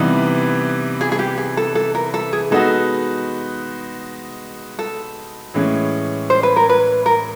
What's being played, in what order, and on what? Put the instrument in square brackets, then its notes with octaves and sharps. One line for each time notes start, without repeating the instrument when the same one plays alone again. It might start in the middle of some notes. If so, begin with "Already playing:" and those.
Already playing: [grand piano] C3 E3 G3 B3 D#4
[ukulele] G#4
G#4
G4
G#4
A4
A4
A#4
A4
G#4
[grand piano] G#3 B3 D#4 F#4 [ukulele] A4
[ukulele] A4
[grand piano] A2 E3 G#3 C#4
[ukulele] C5
B4
A#4
B4
A#4